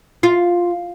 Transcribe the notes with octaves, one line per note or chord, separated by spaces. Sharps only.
F4